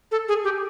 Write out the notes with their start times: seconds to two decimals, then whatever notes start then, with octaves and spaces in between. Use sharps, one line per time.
0.12 A4
0.28 G#4
0.44 G4